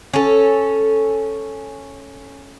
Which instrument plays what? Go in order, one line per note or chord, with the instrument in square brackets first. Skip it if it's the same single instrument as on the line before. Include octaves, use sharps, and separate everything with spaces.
[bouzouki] C#4 A4